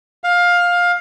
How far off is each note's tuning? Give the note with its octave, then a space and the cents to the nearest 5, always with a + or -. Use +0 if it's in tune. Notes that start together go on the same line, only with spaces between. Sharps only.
F5 +15